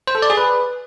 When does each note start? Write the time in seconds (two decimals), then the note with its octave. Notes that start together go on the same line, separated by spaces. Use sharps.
0.07 C5
0.15 A4
0.22 D5
0.30 G#4
0.37 B4